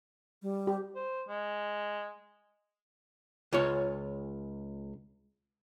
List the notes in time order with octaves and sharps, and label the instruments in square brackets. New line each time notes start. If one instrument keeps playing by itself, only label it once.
[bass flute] G3
[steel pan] G4
[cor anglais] C5
G#3
[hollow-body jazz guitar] C#2 F4 C#5